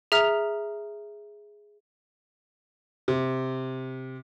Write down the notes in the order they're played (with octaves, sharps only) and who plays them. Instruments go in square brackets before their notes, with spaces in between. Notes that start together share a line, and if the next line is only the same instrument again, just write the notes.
[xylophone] G#4 E5 A#5 F6
[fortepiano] C3